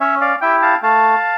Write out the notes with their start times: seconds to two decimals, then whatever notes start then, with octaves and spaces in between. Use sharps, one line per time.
0.01 C#4 C#5 E5
0.21 D5 F5
0.41 E4 G4 E5 G5
0.62 F5 A5
0.82 A3 F5 A5